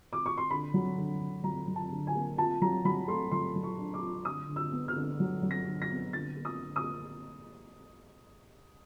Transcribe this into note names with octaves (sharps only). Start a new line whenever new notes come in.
D6
C#6
C6
D3 B5
F#3
D3
D3
F#3 A#5
F#3
A5
D3
G#5
A#3
F4 A5
F#3 A#5
F#3 B5
A3 C6
F#3 C6
F#3
C#6
D4
D6
F4
D3 D#6
D3
E6
B3
F6
D3
F#3
F#3
A#6
D3
A#6
B3
D3 A6
A#3
D#6
D3
D#6
A#3